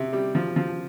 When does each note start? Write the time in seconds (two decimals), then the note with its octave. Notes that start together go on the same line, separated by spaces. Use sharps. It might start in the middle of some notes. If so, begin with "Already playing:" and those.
Already playing: C3
0.13 G3
0.35 F3
0.56 F3